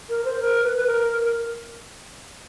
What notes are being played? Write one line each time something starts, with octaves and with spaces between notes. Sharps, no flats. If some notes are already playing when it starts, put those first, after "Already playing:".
A#4
C5
A#4
B4
B4
A#4